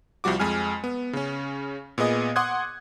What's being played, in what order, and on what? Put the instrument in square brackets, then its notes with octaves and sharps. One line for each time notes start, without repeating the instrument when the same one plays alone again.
[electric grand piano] C2 F3 G3 F#4 D6
F2 G#3 G#5 F6
B3
C#3 C#4
A#2 B3 G#4 D#5 D#6
F#5 C6 D6 D#6 F#6 G#6